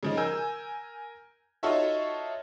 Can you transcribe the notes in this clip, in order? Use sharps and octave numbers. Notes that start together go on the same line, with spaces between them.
C#3 F3 D#4
A#4 G#5 E6 G6
D#4 F4 F#4 A4 C#5 E5